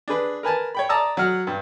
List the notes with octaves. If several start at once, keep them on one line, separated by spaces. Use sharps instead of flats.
D4 G#4 B4
A#4 B4 G#5 A5
C#5 G5 B5
D5 A5 A#5 D#6 E6
F#3 F#5 F6
G2